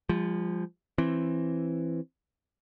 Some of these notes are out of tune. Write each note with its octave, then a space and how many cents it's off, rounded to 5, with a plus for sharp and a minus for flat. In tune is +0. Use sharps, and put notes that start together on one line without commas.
F3 +0 G#3 -45
E3 +10 C4 +15